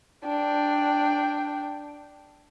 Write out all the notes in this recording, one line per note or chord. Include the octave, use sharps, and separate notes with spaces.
D4 G5